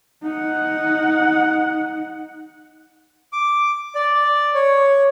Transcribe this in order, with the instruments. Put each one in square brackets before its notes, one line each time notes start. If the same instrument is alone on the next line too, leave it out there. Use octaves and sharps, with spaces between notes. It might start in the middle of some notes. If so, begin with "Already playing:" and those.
[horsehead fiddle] D#4 F#5
[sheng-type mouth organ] D6
D5
C#5